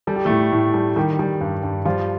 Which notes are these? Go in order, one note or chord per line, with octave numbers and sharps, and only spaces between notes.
G3 A4
G4
A2 A3 A4
A2
G3
D#3 G3 G4
G3
G2
G2
F3 G3 F4